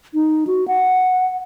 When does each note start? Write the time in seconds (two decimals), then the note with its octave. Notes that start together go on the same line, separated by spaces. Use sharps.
0.14 D#4
0.47 F#4
0.68 F#5